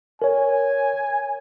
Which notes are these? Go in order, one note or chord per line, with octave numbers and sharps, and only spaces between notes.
A#4 C#5 G#5